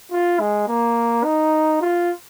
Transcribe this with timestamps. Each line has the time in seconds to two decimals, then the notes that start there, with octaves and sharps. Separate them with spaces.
0.12 F4
0.40 G#3
0.68 A#3
1.24 D#4
1.81 F4